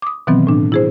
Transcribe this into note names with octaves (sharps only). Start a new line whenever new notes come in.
D6 D#6
B2 D#3 E3 F#3 B3 C4
A2 D4
E4 G#4 C5